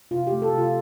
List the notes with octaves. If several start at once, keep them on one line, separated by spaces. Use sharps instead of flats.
C3 F4
A3 G4
A4
C3
F4